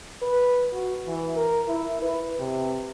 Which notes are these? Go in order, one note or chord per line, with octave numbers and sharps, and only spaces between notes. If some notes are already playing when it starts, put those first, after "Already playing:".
B4
F#4
E3
A#4
E4
B4
C3